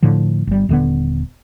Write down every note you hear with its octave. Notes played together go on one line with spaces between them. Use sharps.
A2 D3 F3
G1 G3
D#1 D3 B3